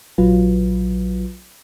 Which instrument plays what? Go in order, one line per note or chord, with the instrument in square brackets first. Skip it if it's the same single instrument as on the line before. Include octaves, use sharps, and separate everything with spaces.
[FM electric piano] A#1 F#3 F4 B4